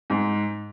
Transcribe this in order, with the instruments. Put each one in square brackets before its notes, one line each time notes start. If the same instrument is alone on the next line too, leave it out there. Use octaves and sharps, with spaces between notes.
[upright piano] G#2